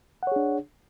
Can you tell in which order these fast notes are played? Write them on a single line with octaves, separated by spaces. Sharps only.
F#5 C#5 G#4 D4